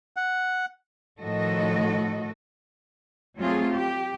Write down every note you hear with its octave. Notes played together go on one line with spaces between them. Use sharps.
F#5
A2 D#3 F3 F#4 A4 D#5
F#3 A3 C4 F4 G#4
G4